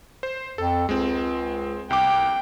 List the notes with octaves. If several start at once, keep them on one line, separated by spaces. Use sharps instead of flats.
C5
F2 A4
C#2 G#3 C4
C2 G5 D6